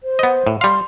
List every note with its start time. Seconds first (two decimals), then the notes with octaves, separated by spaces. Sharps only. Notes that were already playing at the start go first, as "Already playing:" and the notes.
0.03 C5
0.19 B3 D#5
0.47 A2
0.61 G3 F5 C6